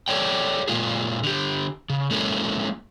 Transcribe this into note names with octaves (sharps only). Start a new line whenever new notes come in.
G4 A4 C#5 D5 G5
A#2 G#3 A#3 F4 G#4
D3 G4
C#3
G#3 A#3 C#4 E4 A4